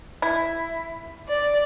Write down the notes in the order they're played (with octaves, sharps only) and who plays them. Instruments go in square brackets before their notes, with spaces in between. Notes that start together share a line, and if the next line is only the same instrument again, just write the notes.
[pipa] E4
[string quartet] D5